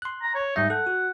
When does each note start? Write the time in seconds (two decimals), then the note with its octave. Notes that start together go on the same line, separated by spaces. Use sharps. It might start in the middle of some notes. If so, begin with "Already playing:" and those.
0.02 C6 F#6
0.22 A#5
0.35 C#5
0.56 G#2 G3 D#4 E5
0.70 A4 F#5
0.87 F#4